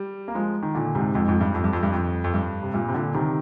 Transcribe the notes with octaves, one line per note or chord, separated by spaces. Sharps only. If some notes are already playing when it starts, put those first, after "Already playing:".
Already playing: G3
A#3
F3 G#3
D#3
A#2 D3
G#2 C3
F2 G#2
F2 G#2
G2
F2
G2
F2
G2
F2
F2
G2
C3
G2 A#2
C3
A#2 D3
C3 D#3